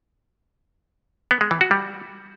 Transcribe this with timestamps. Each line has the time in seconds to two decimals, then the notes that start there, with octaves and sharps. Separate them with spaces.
1.31 B3
1.41 G#3
1.51 E3
1.61 F#4
1.71 G3